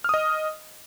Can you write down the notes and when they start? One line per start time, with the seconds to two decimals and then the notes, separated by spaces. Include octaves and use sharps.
0.04 F6
0.09 D#6
0.14 D#5